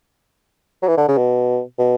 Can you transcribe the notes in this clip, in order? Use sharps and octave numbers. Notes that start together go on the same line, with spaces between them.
F#3
E3
D3
C#3
B2
B2